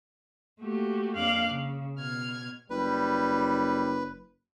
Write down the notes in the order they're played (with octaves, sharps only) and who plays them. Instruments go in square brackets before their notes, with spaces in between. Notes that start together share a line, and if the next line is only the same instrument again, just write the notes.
[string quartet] A3 A#3 F#4 G4
F2 A#3 D4 F5 D6 F#6
C#3
B2 F6 G#6
[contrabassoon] F#1 [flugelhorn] G3 [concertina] B4